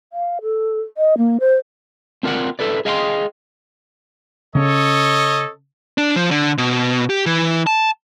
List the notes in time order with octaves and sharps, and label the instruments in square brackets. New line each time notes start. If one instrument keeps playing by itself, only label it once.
[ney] F5
A4
D#5
A#3
C5
[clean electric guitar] C4 F4 A#4 D5 F#5
E4 A4 B4 D5
G#4 D#5 F5 G5 A5 C6
[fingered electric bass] C#3 C#4 [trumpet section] A4 C#5 D#5
[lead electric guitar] D4
F3
D3
B2
G4
E3
A5